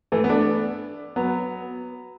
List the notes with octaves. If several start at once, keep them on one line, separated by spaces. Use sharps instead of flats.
E3 A3
B3
A3 D4
F#3 B3